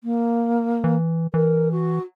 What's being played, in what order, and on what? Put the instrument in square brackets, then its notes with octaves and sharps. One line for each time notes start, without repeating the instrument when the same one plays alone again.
[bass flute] A#3
[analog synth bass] E3
[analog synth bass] E3 [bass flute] A#4
[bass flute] F#4